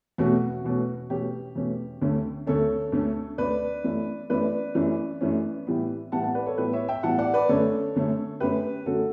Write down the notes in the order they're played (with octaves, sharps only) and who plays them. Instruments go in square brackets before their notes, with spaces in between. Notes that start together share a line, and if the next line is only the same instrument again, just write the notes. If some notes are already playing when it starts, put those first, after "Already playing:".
[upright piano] E2 B2 A3 C#4 F#4
E2 B2 A3 C#4
E2 B2 A3 C#4 G4
E2 B2 A3 C#4
D2 D3 A3 C#4
D2 D3 A3 C#4 A4 C#5
D2 D3 A3 C#4
D2 D3 A3 C#4 B4 D5
F#2 E3 A3 C#4
F#2 E3 A3 C#4 B4 D5
F#2 E3 A3 C#4
F#2 E3 A3 C#4
A2 E3 G3 B3
A2 E3 G3 B3 F#5 A5
F#5 A5
B4 D5
A4 C#5
A2 E3 G3 B3 G4 B4
C#5 E5
E5 G5
A2 E3 G3 B3 F#5 A5
D5 F#5
B4 D5
F#2 D3 A3 C#4 A4 C#5
F#2 D3 A3 C#4
F#2 D3 A3 C#4 G4 B4
F#2 D3 A3 C#4 F#4 A4